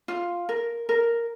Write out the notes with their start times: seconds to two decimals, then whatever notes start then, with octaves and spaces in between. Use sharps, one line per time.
0.08 F4
0.49 A#4
0.89 A#4